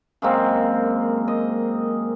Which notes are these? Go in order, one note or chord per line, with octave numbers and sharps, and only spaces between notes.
F#2 G#3 A#3 C4
D#5